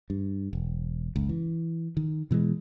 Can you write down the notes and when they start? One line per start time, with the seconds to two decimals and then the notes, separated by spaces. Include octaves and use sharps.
0.10 G2
0.53 E1
1.16 F#1 C#2
1.29 E3
1.97 D#3
2.31 B2 E3 F3 G#3